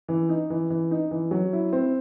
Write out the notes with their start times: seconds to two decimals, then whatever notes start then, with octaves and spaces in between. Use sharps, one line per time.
0.08 E3
0.29 D#4
0.50 E3
0.70 E3
0.91 D#4
1.11 E3
1.31 F#3
1.53 E4
1.73 C4